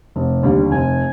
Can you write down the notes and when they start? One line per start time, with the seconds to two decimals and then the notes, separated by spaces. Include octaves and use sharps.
0.16 F1
0.43 D#2 D3 G3
0.71 F1 G#5